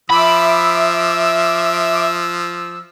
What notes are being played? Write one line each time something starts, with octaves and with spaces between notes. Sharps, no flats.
F3 E5 B5 D6 E6